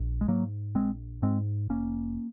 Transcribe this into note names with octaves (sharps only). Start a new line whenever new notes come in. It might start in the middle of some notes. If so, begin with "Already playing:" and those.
Already playing: A#1
G#3
G#2 F#3 A#3
A#1 G#3 C4
G#2 G#3 C4
F1 A#3 C#4